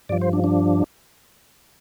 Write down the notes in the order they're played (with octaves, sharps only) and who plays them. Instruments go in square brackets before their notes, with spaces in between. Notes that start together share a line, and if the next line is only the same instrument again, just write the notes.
[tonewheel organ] G2 D5
F3
C5
D4
D4